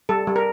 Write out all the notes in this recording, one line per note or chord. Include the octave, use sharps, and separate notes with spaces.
G3 A4
G3
A#4